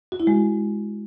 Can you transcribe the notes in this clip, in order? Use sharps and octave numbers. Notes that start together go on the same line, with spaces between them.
F#4
E4
G#3